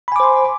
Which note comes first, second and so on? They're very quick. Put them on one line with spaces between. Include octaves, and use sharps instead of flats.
B5 G#5 D6 C5 C6